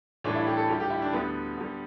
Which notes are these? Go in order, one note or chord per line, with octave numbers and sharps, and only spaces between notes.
A2 E3 G3 D4
E4
G4
A4
D2 D3 G3 G4
G4
E4
D4
D2 D3 G3 B3
D2 D3 G3